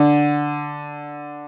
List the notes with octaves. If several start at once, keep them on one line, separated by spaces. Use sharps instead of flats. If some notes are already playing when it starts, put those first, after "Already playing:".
Already playing: D3